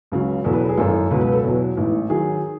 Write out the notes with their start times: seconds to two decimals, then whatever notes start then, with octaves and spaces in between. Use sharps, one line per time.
0.12 C#2 C#3 F#3
0.44 E2 B2 F#3 A4
0.53 B4
0.61 A4
0.69 G#4
0.77 G#1 F#2 E3 A4
1.11 C#2 B2 F#3 B4
1.21 B4
1.32 A4
1.44 E2 B2 F#3
1.77 A1 G#2 E3
2.10 D#3 F#3 G#4